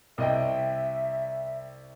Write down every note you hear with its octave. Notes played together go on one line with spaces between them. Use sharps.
C2 D#5 E5 G5